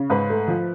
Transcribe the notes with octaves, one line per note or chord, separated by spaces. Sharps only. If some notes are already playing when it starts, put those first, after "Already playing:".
Already playing: C#3
G#2 B4
A3
F3